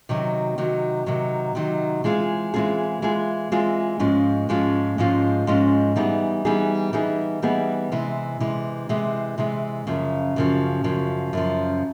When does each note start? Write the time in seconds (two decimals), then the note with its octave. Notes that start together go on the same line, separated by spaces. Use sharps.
0.09 C3 D#3 F#3
0.58 C3 D#3 F#3
1.06 C3 D#3 F#3
1.55 C3 D#3 F#3
2.04 E3 G#3 C4 F4 G#4
2.54 E3 G#3 C4 F4 G#4
3.02 E3 G#3 C4 F4 G#4
3.52 E3 G#3 C4 F4 G#4
4.00 G#2 F3 G#3 C#4 F4
4.49 G#2 F3 G#3 C#4 F4
4.98 G#2 F3 G#3 C#4 F4
5.47 G#2 F3 G#3 C#4 F4
5.96 E3 G3 B3 D#4 G#4
6.45 E3 G3 B3 D#4 G#4
6.93 E3 G3 B3 D#4 G#4
7.42 E3 G3 B3 D#4 G#4
7.92 C3 E3 G#3
8.40 C3 E3 G#3
8.89 C3 E3 G#3
9.38 C3 E3 G#3
9.87 F#2 C#3 F3
10.36 F#2 C#3 F3
10.84 F#2 C#3 F3
11.33 F#2 C#3 F3